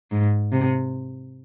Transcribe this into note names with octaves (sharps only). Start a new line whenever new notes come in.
G#2
C3